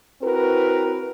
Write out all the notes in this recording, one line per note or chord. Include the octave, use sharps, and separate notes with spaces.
C4 E4 F#4 A#4 B4